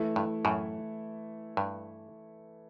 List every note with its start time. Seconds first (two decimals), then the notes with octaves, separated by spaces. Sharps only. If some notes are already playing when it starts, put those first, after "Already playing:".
Already playing: E3 A3 E4
0.16 G2
0.45 F#2 A2
1.57 G2